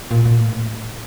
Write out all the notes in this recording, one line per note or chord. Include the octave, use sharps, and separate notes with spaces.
A#2
A#2
A2